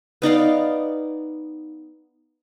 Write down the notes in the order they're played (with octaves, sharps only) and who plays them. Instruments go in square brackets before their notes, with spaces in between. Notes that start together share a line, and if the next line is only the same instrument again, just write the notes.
[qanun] B3 D#4 D5 F5